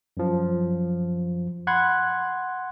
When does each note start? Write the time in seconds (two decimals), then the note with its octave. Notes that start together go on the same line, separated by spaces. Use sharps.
0.17 F#2 F3
1.67 F#5 B5 C6 F#6 G#6